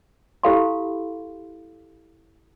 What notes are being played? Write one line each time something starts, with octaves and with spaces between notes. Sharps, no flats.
E4 G4 A4 F5 B5 C6